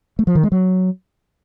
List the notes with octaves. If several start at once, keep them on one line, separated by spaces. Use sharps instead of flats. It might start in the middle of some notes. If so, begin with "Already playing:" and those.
A3
F3
D#3
G#3
F#3